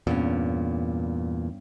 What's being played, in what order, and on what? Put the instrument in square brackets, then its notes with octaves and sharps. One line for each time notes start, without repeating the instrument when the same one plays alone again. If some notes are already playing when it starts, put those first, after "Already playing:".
[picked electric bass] E2 A#2 [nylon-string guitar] G2 B3 C#4